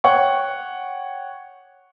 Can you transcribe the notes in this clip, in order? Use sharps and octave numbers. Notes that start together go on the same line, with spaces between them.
C#5 F#5 G5 C#6